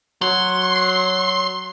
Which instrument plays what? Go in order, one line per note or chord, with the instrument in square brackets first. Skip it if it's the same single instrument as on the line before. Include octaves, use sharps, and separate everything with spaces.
[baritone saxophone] F#3 [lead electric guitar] C6